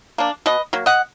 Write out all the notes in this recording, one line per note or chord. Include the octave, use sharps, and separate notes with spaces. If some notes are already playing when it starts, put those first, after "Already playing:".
A#3 D4
B2 B4 D#5
F#3 A#3
D#5 F#5